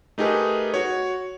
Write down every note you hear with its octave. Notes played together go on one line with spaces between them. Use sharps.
A3 D#4 G4 G#4 A#4 B4
F#4 C#5